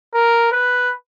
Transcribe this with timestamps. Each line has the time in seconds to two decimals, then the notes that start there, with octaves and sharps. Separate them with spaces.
0.14 A#4
0.52 B4